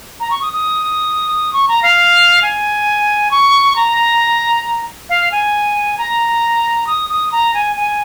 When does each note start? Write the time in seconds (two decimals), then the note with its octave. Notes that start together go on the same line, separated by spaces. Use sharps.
0.20 A#5
0.31 C#6
0.42 D#6
0.53 D#6
1.53 C#6
1.68 A#5
1.83 F5
2.42 G#5
3.31 C#6
3.76 A#5
5.09 F5
5.32 G#5
5.98 A#5
6.87 D#6
7.10 D#6
7.32 A#5
7.54 G#5
7.76 G#5